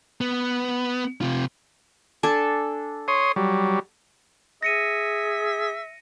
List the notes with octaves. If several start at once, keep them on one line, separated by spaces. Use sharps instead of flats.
B3
C3 F4
D4 A4 G#5
C#5 C6 D#6
F#3 G3
G#4 E5 A#6 C#7 D#7